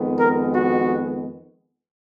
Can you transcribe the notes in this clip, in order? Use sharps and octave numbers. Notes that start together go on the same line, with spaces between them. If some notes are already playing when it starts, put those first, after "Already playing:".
Already playing: F2 D#3 G#3 B3
A#4
F#4